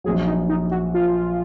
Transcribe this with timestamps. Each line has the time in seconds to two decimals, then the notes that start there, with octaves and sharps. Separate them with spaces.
0.04 A#1 A#2 F#3 G#4
0.27 D#4
0.49 D#4
0.71 F#4
0.94 F4